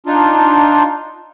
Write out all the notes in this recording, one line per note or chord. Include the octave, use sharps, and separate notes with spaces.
D4 D#4 F4